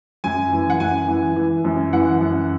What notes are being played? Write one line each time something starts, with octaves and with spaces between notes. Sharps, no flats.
F#2 G#5
E3
F#5
F#2 G#5
E3
E3
F#2
E3 F#5
F#2